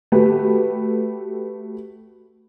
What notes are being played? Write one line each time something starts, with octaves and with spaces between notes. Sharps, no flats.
A3 F#4 G4 B4